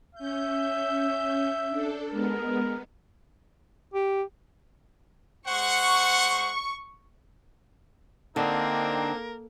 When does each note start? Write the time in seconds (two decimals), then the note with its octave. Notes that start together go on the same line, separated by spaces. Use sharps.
0.15 C#4 E5 G6
1.69 D4 A4
2.11 G#3 B3 A#4
3.94 G4
5.47 G#3 C5 F#5 C#6
8.36 D3 A#3 C4 D4 D#4 A#4